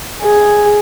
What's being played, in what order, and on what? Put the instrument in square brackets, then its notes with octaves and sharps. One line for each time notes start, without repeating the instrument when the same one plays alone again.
[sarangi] G#4